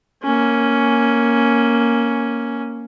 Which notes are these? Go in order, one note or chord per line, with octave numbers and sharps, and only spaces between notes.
A#3 C#4